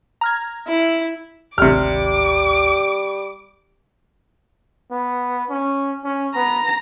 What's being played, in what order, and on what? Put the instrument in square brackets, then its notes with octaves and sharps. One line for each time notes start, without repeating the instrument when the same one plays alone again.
[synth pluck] A#5 F6 G#6
[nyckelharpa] E4
[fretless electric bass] D1 G#1 D#3 [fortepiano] C3 F6 [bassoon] G3 [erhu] D6
[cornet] B3
C#4
C#4
[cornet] B3 [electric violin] A#5